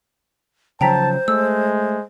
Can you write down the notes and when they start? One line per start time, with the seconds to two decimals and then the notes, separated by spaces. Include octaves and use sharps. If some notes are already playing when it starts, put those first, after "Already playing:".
0.81 C#3 F3 F#3 C5 G5 A5 A#5 B6
1.28 G#3 A3 E6